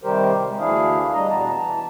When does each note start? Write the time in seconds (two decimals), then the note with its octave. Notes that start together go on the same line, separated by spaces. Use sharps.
0.04 C3 D#3 G3 G4 A#4 C5
0.47 G#3
0.59 D2 E3 D4 E4 G#4 F5
1.14 G3 D4 D#5 A#5
1.30 E2 B2 B3 A5 A#5
1.60 E3 A5